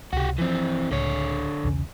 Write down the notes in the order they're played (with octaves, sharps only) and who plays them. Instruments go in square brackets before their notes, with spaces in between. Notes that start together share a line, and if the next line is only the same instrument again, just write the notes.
[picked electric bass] C#2 C3 [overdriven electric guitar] F#4 G4
[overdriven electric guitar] E3 C4 [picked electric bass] F3
[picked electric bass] C#2 A2 [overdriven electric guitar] D3 C#5
[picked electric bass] B1 E2 C#3